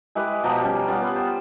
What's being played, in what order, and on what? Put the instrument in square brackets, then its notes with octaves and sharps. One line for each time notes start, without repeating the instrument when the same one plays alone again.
[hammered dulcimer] G#3 E4 G4 B4
B2 F3 G5 A#5
G3 C#4
G3 B3 F4
B3
C5